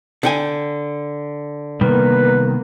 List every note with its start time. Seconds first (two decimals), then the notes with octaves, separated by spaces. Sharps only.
0.23 D3 G5 G#5
1.81 C3 D#3 G3 A#3 B3 B4